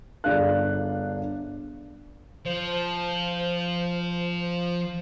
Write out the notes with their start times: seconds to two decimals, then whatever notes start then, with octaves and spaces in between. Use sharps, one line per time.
0.24 G1 D4 G#4 F5 F#6
2.45 F3 C5